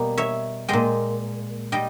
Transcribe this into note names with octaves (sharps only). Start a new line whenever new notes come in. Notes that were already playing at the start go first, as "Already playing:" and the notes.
Already playing: B2 G3 A#3
C#5 E5
A#2 G#3 D#5 G5
G3 D#5 G5